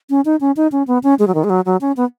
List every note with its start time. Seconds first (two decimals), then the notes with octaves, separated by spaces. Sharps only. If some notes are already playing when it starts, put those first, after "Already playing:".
0.10 C#4
0.25 D#4
0.41 C#4
0.57 D#4
0.72 C#4
0.87 B3
1.03 C#4
1.19 G#3
1.27 F#3
1.35 D#3
1.44 G#3
1.50 F#3
1.66 F#3
1.81 C#4
1.97 B3